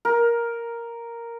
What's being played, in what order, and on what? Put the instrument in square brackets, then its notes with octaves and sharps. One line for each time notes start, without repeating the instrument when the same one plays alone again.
[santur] A#4